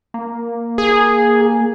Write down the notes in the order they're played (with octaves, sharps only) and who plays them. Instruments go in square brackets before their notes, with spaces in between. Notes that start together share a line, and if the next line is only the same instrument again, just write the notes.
[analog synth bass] A#3
[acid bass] G#4